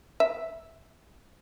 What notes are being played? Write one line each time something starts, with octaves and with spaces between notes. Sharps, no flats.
E5